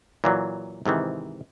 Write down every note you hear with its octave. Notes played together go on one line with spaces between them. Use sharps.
A#2 E3 F#3
G#2 C3 D#3 E3